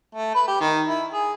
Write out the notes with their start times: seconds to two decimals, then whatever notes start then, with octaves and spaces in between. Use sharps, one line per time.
0.15 A3
0.35 B4
0.48 G4
0.61 D#3
0.87 E4
1.14 G#4